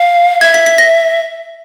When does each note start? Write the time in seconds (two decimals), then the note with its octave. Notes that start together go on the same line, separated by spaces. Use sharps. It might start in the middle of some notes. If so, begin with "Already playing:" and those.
Already playing: F5
0.41 E5 G#6
0.54 B6
0.66 B6
0.78 A#6